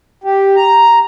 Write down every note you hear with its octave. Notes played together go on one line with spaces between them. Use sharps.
G4
A#5